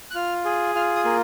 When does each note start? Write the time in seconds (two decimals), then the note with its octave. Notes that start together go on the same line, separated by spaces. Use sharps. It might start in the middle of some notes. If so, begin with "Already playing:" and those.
0.11 F#6
0.15 F4 F6
0.45 G#4
0.75 F4 F6
0.96 D#6
1.05 A#3